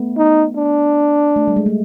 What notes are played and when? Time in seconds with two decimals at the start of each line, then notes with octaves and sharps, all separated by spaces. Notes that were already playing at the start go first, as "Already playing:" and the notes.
Already playing: A3 B3
0.17 D#4
0.56 D4
1.36 A3
1.48 G3
1.56 G#3
1.66 A3